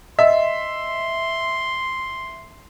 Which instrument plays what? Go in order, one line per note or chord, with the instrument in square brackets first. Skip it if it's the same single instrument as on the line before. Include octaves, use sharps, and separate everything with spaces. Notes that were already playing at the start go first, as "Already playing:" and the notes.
[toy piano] D#5 [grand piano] E5 [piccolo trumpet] C6